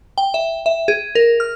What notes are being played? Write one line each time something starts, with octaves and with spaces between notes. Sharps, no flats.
G5
E5
E5
G#4
A#4
F6